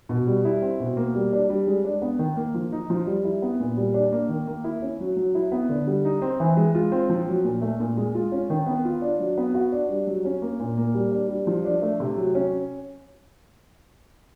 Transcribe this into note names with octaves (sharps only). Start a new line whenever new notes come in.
B2
G3
E4
C4
B2
A#3
G3
D4
G3
G#3
D4
B3
D#3
A#3
F3
D#4
F3
G3
E4
B3
A#2
G3
D4
A#3
D#3
A#3
E4
C#4
F#3
F#3
E4
B3
D3
G3
D#4
C4
E3
G#3
F4
C4
F3
F#3
A#2
A3
A#2
G#3
F4
C#4
D#3
B3
F4
D4
F#3
B3
F#4
D4
G3
F#3
C#4
A#3
A#2
A#3
G3
D4
G3
F3
D4
A3
C3
F#3
C#4